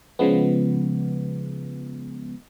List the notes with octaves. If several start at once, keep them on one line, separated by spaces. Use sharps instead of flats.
C#3 F3 G#3 B3